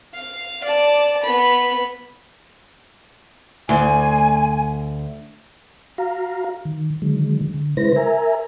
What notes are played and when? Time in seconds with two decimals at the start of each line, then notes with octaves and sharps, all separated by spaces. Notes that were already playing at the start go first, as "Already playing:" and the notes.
0.14 F5
0.64 D5 A5
1.23 B3 B5
3.69 D2 G#5
5.98 F#4 F5 A#5
6.65 D#3
7.02 D3 D#3 F#3 G#3
7.54 D3
7.77 C#3 G#3 E4 B4 C5 A#6
7.96 A#4 E5 G#5 A#5